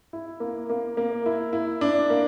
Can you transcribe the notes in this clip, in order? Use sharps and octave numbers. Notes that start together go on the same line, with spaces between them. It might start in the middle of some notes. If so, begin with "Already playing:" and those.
E4
A#3
A#3
A#3
E4
E4
D4
A#3